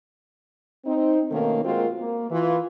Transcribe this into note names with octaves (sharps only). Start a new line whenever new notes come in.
C4 D#4
B2 D#3 A3 A#3 C#4 D#4
G#3 A#3 C4 F4 F#4 A#4
A#3
E3 F4